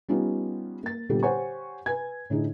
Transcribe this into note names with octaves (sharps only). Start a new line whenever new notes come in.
G3 B3 C#4 D#4 F4
A#3 A6
A#2 D3 G3 B3 G4 A4
G4 C5 C#5 F#5 G#5 C#6
B4 G#5 G#6
A2 D3 D#4 G#4